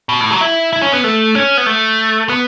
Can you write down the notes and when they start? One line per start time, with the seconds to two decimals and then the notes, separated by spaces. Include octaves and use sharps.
0.09 B2
0.20 A2
0.30 F#3
0.41 E4
0.73 E4
0.82 C#4
0.93 B3
1.04 A3
1.35 C#4
1.57 B3
1.66 A3
2.29 B3